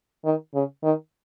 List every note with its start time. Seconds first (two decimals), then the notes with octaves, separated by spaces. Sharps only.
0.25 D#3
0.54 C#3
0.83 D#3